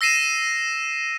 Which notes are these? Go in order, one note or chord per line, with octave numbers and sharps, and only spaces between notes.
E6 A#6 C7 D#7 E7